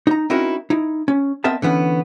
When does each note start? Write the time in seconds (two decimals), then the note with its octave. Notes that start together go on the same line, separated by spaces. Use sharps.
0.07 D#4 A#5
0.30 C4 C#4 D#4 E4 F#4 A#4
0.70 D#4 E4
1.08 C#4
1.44 B3 C4 A#4 D#5 E5 A5
1.62 D3 E3 B3 C#4